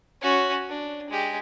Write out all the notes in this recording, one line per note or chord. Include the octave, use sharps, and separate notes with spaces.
C#4 F#4
D4
G#3 G4